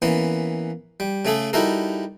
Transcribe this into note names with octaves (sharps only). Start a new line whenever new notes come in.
E3 A#3 B3 C#4
G3
C#3 A3 G#4 A4
G3 D#4 E4 F#4 A4 A#4